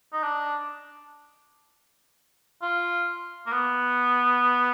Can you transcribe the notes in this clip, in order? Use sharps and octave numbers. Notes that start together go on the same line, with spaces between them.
D#4
D4
F4
A#3
B3